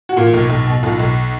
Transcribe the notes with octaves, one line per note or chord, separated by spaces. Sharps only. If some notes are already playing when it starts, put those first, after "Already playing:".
F#4
A#2 F4
B1
B1
B2
B1 F4
B1